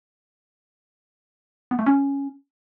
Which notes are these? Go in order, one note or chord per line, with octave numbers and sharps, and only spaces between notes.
B3
A3
C#4